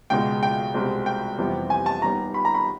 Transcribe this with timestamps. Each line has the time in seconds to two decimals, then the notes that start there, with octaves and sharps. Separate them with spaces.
0.10 C#2 B2 G#3 G5
0.43 G5
0.74 C2 B2 G#3 C4
1.06 G5
1.38 F2 C3 E3 G3 B3
1.70 G#5
1.86 A5
2.02 D#2 D#3 G3 B3 A#5
2.34 B5
2.45 A#5
2.55 B5